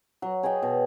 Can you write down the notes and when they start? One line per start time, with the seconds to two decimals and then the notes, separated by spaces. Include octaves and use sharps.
0.22 F#3
0.43 G#4 C#5 D#5 G5
0.62 B2